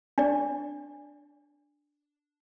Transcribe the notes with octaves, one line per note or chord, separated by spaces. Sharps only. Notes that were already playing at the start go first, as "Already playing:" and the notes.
D4 D5